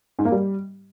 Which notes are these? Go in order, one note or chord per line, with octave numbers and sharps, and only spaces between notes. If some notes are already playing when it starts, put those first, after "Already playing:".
G#2
A#3
G3